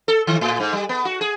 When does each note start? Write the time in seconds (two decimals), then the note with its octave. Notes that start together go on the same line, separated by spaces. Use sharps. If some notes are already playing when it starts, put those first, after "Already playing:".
0.08 A4
0.27 D#3
0.41 A2
0.60 G#2
0.73 G3
0.89 B3
1.05 F#4
1.21 G#4